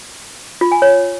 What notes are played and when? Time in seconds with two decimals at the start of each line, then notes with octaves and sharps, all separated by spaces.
0.61 F4
0.72 G#5
0.82 C#5